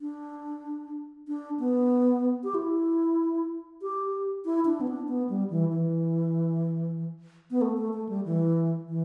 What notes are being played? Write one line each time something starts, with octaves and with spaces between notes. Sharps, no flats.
D4
D4
B3
G4
E4
G4
E4
D4
B3
D4
B3
G3
E3
E3
B3
A3
A3
A3
G3
E3
E3